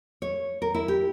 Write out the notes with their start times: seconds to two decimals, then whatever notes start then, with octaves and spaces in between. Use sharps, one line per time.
0.22 C#5
0.62 A#4
0.74 E4
0.88 G4